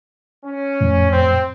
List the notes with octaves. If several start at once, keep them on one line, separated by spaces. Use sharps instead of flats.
C#4
F2 A2
C4